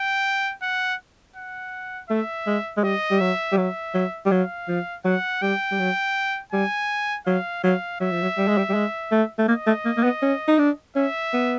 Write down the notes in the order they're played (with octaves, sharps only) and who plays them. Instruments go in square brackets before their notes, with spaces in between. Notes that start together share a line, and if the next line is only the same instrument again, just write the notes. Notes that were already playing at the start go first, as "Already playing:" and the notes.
Already playing: [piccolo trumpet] G5
F#5
F#5
[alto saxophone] A3 [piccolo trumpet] E5
[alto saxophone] G#3
G#3
[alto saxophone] G3 [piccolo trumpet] D#5
[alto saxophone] G3
[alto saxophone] F#3 [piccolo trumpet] E5
[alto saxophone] G3
[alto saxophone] F#3 [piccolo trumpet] E5
[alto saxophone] F#3
G3
[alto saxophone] F#3 [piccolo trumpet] F5
[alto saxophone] F3
[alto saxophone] F#3 [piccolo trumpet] F#5
[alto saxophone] G3 [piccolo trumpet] G5
[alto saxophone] G3
F#3
[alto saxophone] G3 [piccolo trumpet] G#5
[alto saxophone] F#3 [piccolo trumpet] F5
[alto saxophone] F#3 [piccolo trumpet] F5
[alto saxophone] F#3 [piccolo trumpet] E5
[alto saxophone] F3
F#3
G3
G#3
G3
G3
G#3
A3
A3
[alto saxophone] A#3 [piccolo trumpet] D#5
[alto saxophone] A3
A#3
A#3
B3
C#4
D#4
D4
[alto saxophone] C#4 [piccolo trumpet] E5
[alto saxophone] B3